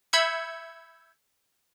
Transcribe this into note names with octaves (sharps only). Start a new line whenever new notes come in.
E5 B5 E6 G6 G#6 C#7